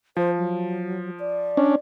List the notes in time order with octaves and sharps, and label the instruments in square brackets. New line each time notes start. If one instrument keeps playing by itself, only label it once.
[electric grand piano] F3 [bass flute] C5
[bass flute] F#3
D5
[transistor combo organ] C#4 D4